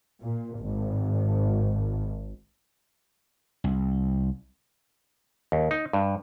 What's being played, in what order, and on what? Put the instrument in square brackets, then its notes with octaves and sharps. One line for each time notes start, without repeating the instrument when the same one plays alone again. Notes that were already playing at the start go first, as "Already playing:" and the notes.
[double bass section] A#2
G#1
[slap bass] C2
[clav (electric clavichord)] D#2
D#4
G2